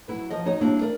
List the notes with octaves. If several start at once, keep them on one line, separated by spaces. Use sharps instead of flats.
F#3 E4 B4
F3 D#5
D#4 F#4 C#5 D#5
G3 A#3 C4 D4 E4
A#4 D5